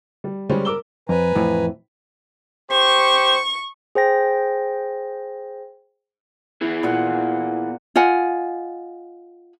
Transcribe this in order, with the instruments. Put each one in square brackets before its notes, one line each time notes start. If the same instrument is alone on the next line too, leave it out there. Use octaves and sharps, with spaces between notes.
[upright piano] G3
C#3 G3 G#3 C#4 C5
A#4 D6 E6 G7
[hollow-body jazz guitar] F2 [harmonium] B4 G#5 A#5
[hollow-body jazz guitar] F2 A2 E3
[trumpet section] G4 C5 [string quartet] C#6
[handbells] G#4 C5 G5 A#6
[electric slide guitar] B3 E4 G#4
[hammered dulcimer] A#2 F#5
[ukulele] F4 D#5 F#5 G#5